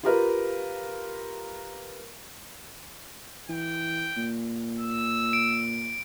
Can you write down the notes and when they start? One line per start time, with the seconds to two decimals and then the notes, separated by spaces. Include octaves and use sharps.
0.03 F4 G4 A#4 B4
3.49 E3 G5
4.17 A#2
4.79 E6
5.33 D7